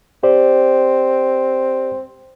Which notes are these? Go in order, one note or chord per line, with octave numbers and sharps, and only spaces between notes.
C4 G4 C5 D5